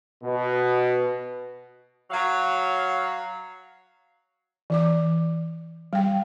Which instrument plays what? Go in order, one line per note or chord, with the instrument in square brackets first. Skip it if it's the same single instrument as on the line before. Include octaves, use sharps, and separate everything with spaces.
[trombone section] B2
[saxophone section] F#3 F5
[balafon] E3 D5 D6
G3 G5